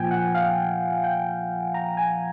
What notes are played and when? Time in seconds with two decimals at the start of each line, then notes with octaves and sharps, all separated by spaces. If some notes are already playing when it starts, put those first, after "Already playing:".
Already playing: A#2 F3 G5 G#5
0.11 F#5
0.35 F5
1.04 G5
1.74 A#5
1.97 G#5